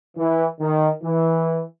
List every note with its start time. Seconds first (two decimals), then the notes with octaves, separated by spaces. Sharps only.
0.17 E3
0.60 D#3
1.03 E3